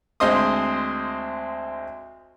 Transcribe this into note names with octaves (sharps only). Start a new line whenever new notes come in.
D2 G#3 C4 D#5 C6 D#6